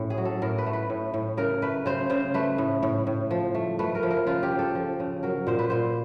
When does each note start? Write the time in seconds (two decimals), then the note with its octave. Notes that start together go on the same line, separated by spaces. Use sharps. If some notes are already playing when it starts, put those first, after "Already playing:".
Already playing: A2 C#4
0.10 G#4
0.18 F#3
0.25 A4
0.42 A2 A#4
0.58 B4
0.66 A3
0.73 B4
0.90 A2
1.14 A2
1.37 C#3 A#4
1.62 A3 B4
1.86 C#3 C5
2.10 C#3 C5
2.34 A3 B4
2.58 A2
2.83 A2
3.07 A2
3.31 F3
3.54 A3
3.79 A3 B4
3.95 A#4
4.03 F3
4.10 A#4
4.27 C#3 F4
4.43 G4
4.52 C#3
4.59 A4
4.75 F3
5.00 C#3
5.23 F#3 A#4
5.47 A#2 C5
5.59 B4
5.70 A#2 C5